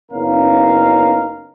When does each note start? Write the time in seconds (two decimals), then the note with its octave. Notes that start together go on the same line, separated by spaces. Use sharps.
0.12 F#1 B3 C#4 D#4 A#4 F5